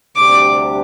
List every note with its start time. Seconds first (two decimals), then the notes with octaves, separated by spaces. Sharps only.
0.16 D2 C3 G3 D4 G4 D6